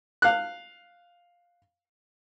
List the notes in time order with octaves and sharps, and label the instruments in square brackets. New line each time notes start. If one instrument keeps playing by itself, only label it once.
[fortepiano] F5 F#6